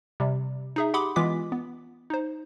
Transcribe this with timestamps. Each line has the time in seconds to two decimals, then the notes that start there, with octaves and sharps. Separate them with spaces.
0.20 C3 G3
0.76 D#4 G#4 E5
0.94 G4 F#5 B5 C6 D6 D#6
1.16 E3 G#3 B3 F4 D6 B6
1.52 B3
2.10 D#4 C5